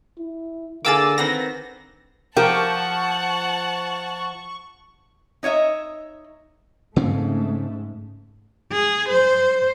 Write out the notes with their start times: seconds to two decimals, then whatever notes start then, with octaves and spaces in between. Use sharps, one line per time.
0.19 E4
0.85 D3 A#3 G4 G#4 D6 E6 A6
1.18 D#3 B3 C4 A#6
2.37 F3 G4 A#4 F#5 G5 A5 C#6
5.43 D#4 C#5 D#5 E5
6.96 G#2 C#3 A3 C4 C#4
8.72 G#4
9.09 C5